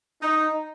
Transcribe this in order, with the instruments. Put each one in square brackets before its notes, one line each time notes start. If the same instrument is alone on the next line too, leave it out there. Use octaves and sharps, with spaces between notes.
[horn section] D#4